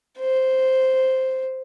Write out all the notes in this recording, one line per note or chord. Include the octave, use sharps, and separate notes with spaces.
C5